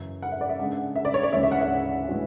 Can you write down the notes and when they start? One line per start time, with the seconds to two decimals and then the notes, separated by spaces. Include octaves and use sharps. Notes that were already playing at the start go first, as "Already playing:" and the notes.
Already playing: F#2 C#3 E3
0.22 F#5
0.32 E5
0.41 D5
0.49 E5
0.59 C#3 G#3 D4 F#5
0.96 E5
1.05 D5
1.14 C#5
1.23 D5
1.33 D2 C#3 E3 G#3 C#4 E5
1.43 E5
1.52 F#5
1.61 E5
2.08 A2 E3 G#3 D4 F#4